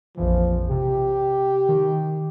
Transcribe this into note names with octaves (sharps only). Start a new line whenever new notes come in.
A#1 F2 E3 F3
C3 G4
D#3